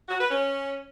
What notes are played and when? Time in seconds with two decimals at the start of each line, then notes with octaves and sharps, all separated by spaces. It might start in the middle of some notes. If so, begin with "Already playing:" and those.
0.09 F#4
0.19 B4
0.30 C#4